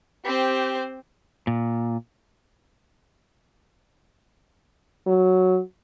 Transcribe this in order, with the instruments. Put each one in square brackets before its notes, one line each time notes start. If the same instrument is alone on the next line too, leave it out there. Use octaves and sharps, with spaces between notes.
[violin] C4 C5 [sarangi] G4
[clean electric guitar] A#2
[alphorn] F#3